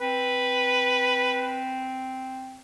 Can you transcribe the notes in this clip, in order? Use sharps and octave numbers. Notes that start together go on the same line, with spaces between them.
C4 B4